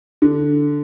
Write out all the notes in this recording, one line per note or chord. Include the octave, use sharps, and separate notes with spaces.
D3